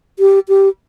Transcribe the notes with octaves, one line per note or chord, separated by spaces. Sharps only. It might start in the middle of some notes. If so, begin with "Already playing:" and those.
G4
G4